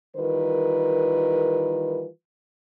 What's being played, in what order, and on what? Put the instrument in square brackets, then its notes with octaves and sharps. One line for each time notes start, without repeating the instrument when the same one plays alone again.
[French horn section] D#3 E3 G3 F4 A#4 B4